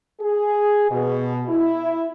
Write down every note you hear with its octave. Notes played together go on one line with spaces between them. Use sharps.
G#4
B2
E4